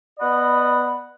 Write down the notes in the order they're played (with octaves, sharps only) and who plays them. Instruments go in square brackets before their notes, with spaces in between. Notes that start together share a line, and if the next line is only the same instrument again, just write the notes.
[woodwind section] B3 D5 D#5 F#5 B5